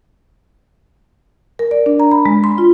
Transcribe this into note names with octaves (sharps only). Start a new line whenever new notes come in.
A#4
D5
D4
A#5
B5
G#3
C6
F4